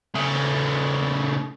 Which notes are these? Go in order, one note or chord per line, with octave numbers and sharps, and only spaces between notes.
C#3 A3